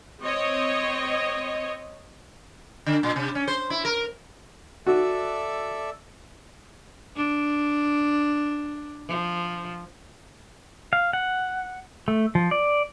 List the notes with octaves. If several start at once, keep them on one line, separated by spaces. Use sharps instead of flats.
C4 C#5 D#5
D3
A#2
C3
C#4
C5
E4
A#4
F#4 A4 D5 E5
D4
F3
F5
F#5
A3
F3
D5